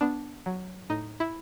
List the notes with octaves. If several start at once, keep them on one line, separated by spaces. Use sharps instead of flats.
B3 D4
F#3
A2 D#4
E4